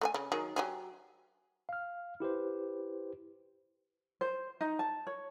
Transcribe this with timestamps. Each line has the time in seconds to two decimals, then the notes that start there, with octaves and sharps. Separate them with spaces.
0.01 A3 A#4 G#5
0.14 C#3
0.32 D#3 F#3 G#4
0.56 F#3 G4 G#4
1.69 F5 F6
2.20 E4 G4 B4 C5
4.21 C5
4.61 D#4
4.79 A5
5.07 C#5